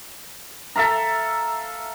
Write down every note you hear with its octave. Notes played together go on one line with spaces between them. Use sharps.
A4 E5 F5 A#5